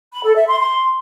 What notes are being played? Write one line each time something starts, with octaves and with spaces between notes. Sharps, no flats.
B5
A4
E5
C6
C6